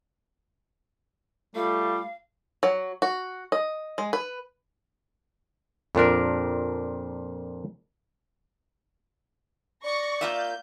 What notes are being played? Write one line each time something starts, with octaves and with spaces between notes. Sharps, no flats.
G3 A3 F4 F5
F#3
F#4
D#5
G#3
B4
F2 A#2 D4 A#4
D5 C#6 A#6
A#3 F4 E5 G6